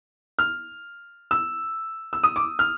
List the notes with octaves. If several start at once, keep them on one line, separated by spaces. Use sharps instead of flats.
F6
E6
E6
D#6
D6
F6